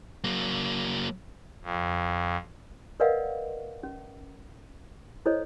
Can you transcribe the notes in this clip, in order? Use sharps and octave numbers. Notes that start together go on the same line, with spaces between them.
F#3 A#3
F2
A#4 B4 D5 D#5 F5 F#5
C#4
E4 A4 C5 C#5 D#5